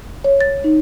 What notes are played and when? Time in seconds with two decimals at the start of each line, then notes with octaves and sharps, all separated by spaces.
0.24 C#5
0.41 A6
0.64 D#4